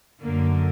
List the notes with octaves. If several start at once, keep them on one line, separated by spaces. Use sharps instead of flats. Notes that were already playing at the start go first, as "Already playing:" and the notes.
F#2 D3 A#3